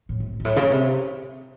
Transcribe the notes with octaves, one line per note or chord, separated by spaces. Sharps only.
A2
C3
G#2
A2
C#3
C3